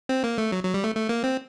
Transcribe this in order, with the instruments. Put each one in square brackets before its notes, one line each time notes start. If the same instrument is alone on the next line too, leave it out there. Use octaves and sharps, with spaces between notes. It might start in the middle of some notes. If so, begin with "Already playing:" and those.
[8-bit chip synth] C4
A#3
A3
F#3
F#3
G3
A3
A3
A#3
C4